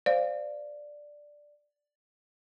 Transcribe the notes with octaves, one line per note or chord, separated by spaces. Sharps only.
C5 D5 F5